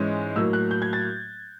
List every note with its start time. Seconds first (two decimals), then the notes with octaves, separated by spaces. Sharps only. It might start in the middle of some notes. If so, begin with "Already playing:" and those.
Already playing: G#2 E3 G#3 C#4
0.36 A2 F#3 A#3 E6
0.53 F#6
0.71 G6
0.82 G#6
0.93 A6